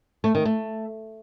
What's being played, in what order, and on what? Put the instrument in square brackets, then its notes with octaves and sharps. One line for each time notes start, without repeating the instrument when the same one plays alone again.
[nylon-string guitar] A3
D#3
A3